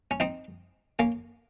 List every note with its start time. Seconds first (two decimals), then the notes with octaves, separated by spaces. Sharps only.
0.11 C#4
0.20 C4 D#4
0.99 A#3 C#4